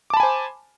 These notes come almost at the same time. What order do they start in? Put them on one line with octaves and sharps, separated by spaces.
D6 A5 B5 G#5 C5